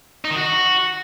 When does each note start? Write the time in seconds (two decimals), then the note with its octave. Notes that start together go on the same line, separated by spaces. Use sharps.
0.25 D#4
0.30 D#3
0.36 F#4